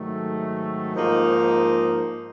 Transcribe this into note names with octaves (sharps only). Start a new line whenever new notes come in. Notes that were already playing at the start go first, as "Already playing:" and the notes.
Already playing: G#2 D#3 F#3 A3
G#2 F3 A#3 D#4